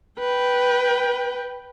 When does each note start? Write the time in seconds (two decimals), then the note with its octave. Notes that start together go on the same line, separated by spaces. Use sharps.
0.19 B4 G5